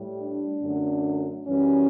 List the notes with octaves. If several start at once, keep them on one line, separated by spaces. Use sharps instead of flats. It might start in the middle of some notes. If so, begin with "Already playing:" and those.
Already playing: A2 G3
D4
F#2 D3 A3
F#2 E3 G3 C#4